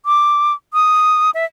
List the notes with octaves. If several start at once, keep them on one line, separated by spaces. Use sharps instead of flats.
D6
D#6
E5